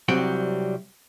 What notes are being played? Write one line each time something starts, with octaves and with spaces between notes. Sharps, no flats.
C2 F#3 G3 C4 G5